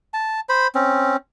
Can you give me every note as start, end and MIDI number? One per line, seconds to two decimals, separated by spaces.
0.14 0.40 81
0.49 0.67 72
0.49 0.67 83
0.75 1.16 60
0.75 1.16 61